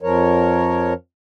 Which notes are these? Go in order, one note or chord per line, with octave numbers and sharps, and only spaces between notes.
F2 F3 A#4 C#5